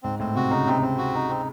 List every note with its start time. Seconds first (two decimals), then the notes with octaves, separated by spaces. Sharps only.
0.03 G#2 C4
0.19 A2 C4
0.35 C3 F#4
0.50 C#3 D#4
0.67 C3 C4
0.82 C4
0.98 F#4
1.14 D#4
1.29 C4